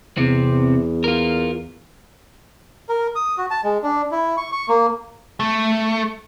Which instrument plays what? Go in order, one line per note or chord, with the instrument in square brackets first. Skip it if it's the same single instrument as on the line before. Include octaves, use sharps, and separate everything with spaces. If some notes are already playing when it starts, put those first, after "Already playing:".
[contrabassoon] E2 [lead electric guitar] C3 C4
[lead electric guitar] F4 A#4
[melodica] A#4
D#6
F#4
A5
G#3
D4
E4
C#6
C#6
A#3
[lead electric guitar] A3